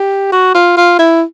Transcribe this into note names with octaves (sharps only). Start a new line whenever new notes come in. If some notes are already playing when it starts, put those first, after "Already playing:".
Already playing: G4
F#4
F4
F4
E4